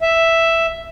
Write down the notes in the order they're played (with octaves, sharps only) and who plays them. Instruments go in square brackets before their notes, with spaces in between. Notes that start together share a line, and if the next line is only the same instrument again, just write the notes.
[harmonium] E5